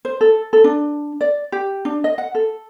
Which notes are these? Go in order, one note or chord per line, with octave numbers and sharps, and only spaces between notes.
C5
A4
A4
D4
D5
G4
D4
D#5
F#5
A4